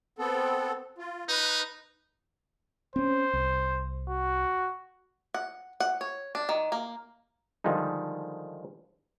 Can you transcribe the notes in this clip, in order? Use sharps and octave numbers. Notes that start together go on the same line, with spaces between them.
B3 C4 A4
F4
D#4 B4
C4 C#4 C5
C2
F#4
F#5
F#5
C#5
D4
D#3
A#3
D3 D#3 F3 G3 G#3 D#4